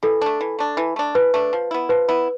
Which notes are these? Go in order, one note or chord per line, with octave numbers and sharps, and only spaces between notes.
E3 A4
A3 D4
E3
A3 D4
E3
A3 D4
E3 B4
A3 D4
F3
B3 E4
F3 B4
B3 E4